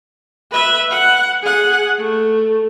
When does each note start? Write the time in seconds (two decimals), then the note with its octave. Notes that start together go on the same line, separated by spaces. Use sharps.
0.51 B4 E5
0.90 F#5
1.43 G#4 F#5
1.98 A3